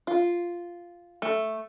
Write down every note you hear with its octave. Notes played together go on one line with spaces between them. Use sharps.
F4
A3